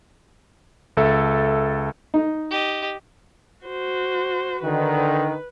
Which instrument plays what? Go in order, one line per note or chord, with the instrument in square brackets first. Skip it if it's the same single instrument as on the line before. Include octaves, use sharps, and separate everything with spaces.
[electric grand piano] C#2 A4 E5
[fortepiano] D#4
[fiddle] G4 D#5
[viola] F#4 C5
[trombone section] D3 D#3 [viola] B4